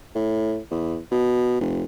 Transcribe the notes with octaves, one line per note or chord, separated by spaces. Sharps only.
A2
E2
B2
F1